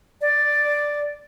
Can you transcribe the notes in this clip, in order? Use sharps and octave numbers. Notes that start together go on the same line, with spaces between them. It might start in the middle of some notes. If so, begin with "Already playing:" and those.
D5